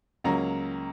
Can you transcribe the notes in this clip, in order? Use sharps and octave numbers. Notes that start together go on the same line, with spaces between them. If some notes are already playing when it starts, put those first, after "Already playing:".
C#2 C#3 F#3 A#3 C#4 A#5